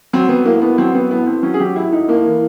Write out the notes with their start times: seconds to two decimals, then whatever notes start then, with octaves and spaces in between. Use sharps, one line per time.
0.13 F#3 C4
0.29 F#3 B3
0.45 A2 A#3
0.62 A2 B3
0.78 F#3 C4
0.95 F#3 B3
1.11 A2 B3
1.27 A2 C4
1.43 F#3 C#4
1.54 G#4
1.59 F#3 G4
1.75 A2 E4
1.92 A2 D#4
2.08 A2 A#3
2.25 E3